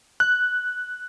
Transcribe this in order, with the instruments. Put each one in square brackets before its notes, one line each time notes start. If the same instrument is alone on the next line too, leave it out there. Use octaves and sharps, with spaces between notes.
[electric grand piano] F#6